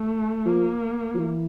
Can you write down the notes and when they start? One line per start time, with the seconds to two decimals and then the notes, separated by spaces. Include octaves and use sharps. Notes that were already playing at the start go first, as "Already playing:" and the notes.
Already playing: A3
0.45 F3 A#3
1.14 F3
1.18 E3